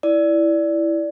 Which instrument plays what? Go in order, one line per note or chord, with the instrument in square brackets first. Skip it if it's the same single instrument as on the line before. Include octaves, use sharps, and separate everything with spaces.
[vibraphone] E4 [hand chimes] D5